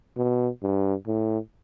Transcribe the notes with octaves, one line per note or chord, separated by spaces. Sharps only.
B2
G2
A2